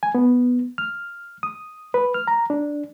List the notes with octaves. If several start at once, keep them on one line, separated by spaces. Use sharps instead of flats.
G#5
B3
F6
D#6
B4
F6
A#5
D4